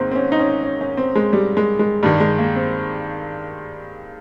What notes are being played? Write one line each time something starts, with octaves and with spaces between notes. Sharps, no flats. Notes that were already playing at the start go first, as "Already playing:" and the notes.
Already playing: G#2 D#3 A#3 C4
C4
C#4
D#4
C#4
C#4
C#4
C4
G#3
G3
G#3
G#3
G2 D#3 G3
G#3
A#3
C4